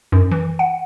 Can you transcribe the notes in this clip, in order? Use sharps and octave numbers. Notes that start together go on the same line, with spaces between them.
F#2
E3
F#5